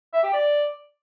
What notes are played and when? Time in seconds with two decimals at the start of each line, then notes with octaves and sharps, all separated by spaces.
0.13 E5
0.23 G4
0.33 D5